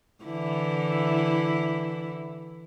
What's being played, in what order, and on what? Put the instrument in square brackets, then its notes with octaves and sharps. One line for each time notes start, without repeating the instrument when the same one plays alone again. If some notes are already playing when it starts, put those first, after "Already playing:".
[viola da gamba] D3 E3 E4